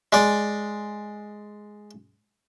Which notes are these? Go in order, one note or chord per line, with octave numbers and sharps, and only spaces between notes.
G#3 D5